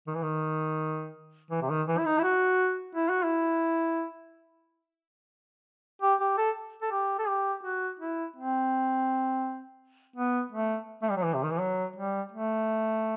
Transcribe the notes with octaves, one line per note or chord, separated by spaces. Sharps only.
D#3
E3
D#3
E3
C3
D#3
E3
E4
D#4
E4
F#4
E4
F#4
E4
G4
G4
A4
A4
G4
A4
G4
F#4
E4
C4
B3
A3
A3
G3
F#3
E3
C3
D#3
E3
F#3
G3
A3